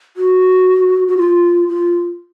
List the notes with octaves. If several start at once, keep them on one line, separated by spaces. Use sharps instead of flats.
F#4
F#4
F4
F4